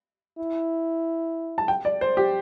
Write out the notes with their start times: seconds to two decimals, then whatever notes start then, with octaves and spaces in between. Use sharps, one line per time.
0.38 E4
1.58 A5
1.68 G5
1.85 D5
2.01 C5
2.17 G4